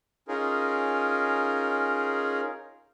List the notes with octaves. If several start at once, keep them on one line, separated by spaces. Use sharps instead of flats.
C#4 D#4 F4 G#4 A#4